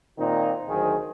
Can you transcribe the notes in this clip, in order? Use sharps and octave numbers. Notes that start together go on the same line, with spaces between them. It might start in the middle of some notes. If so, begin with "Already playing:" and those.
A#2 D#3 C4 D#4 F4
D2 D#3 F#3 G#4 C5